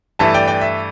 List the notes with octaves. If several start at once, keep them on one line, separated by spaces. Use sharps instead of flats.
G2 E3 A3 E5 A5
D5 G5
D5 G5
E5